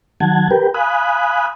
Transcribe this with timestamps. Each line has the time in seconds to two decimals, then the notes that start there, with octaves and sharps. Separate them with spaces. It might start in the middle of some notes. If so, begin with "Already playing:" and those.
0.20 D#3 F#3 F#5 A5 G#6
0.51 G4 A#4 B4 G5
0.74 F5 G#5 B5 D#6 F#6